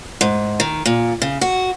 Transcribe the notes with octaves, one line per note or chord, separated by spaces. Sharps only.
G#2
D#3
A#2
C#3
F#4